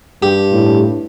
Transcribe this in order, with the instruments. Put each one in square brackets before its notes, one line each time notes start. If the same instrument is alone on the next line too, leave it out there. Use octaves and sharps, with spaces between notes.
[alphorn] G2 [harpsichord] G4
[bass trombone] A2